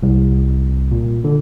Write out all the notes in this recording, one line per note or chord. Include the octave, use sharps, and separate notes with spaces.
C2
A#2
D3